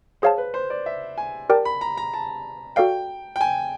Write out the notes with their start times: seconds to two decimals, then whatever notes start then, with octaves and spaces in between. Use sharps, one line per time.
0.22 G#4 C5 C#5 F5 A5
0.38 B4
0.54 C5
0.70 D5
0.86 E5
1.18 G#5
1.50 G4 A#4 D5 G5 A5
1.65 B5
1.81 A#5
1.97 A#5
2.14 A5
2.76 F#4 A4 D5 F5 G5
3.36 G5
3.41 G#5